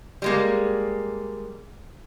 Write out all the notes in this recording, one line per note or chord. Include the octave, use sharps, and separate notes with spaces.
G3 G#3 A#3